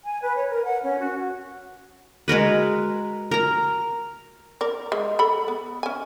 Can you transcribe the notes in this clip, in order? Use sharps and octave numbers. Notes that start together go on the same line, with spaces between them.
G#5
B4
C#5
A#4
F#5
C#4
F#4
G#3 F#4 A#4 B4
A#4 A#5
A#4 D5
G#3
A4 B5
B3
C#4 G#5